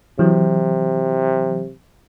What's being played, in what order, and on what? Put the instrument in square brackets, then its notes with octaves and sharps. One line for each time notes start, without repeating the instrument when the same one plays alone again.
[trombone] C3 [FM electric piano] E3 F#3